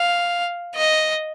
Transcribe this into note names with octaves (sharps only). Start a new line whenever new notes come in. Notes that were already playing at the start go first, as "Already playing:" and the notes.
Already playing: F5
D#5